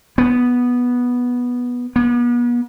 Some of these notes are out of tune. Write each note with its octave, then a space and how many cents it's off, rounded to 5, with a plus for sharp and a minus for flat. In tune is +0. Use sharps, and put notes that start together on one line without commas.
B3 -10
B3 -40